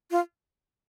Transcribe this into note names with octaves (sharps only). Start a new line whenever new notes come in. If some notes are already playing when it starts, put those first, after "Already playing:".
F4